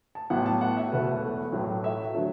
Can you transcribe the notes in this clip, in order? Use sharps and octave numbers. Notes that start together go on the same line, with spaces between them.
A5
A1 A2 F#3 B3 F#5
A5
F#5
E5
E1 E2 B2 A3 B4
A1 A2 F#3 A3
E5
D3 F#3 A3